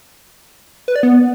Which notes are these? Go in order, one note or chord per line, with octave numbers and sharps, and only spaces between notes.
B4
D5
B3